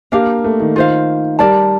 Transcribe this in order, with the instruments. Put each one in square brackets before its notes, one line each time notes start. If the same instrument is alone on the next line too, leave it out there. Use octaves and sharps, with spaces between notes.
[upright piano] A#3 [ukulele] D4 G4 A#4 F5
[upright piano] A3
D#3
[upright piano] D#3 [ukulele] F4 C5 F5
[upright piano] G3 [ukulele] A#4 D5 A5